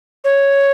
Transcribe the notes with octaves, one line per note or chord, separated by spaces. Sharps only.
C#5